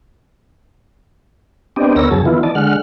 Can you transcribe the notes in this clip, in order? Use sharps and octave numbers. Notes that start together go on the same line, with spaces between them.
B3 C4 D4 G4 D5 D#5
D2 B3 A#4 C#5 E6 A#6
F#2 C#3 F#3 G#4 A5
D#3 E3 B3 E4 F4
D5 D#5 A5
D3 G#3 F#5 F6